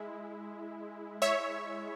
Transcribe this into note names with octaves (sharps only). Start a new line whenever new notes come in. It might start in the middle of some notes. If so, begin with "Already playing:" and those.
Already playing: G#3 E4
C#5 E5